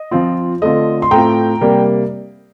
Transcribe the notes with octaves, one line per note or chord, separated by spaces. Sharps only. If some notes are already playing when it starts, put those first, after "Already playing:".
Already playing: D#5
F3 C4 F4
D3 A3 C4 F4 D#5
C6
A2 A3 C4 F4 G5 A#5
C3 G3 A#3